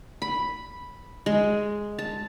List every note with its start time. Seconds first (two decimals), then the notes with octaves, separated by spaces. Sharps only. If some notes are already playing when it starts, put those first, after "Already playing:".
0.22 B5
1.26 G#3
1.99 A5